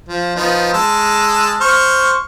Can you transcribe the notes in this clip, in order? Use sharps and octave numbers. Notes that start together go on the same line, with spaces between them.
F3
F3 B3 D#4
G#3 A5 E6
C5 C#6 F6